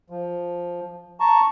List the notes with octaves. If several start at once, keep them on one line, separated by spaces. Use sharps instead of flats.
F3
A5 A#5 C#6